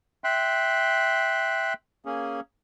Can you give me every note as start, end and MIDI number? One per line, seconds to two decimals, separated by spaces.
0.24 1.73 76
0.24 1.73 79
0.24 1.73 84
0.24 1.73 90
2.05 2.40 58
2.05 2.40 61
2.05 2.40 68